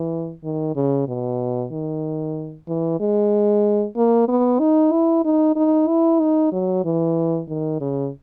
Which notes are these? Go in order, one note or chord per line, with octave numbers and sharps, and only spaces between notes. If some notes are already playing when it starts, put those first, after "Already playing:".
Already playing: E3
D#3
C#3
B2
D#3
E3
G#3
A#3
B3
D#4
E4
D#4
D#4
E4
D#4
F#3
E3
D#3
C#3